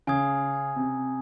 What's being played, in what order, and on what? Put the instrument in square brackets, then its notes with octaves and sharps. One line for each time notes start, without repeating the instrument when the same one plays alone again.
[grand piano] C#3 [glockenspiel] G#5 D#6 G#6
[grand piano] C3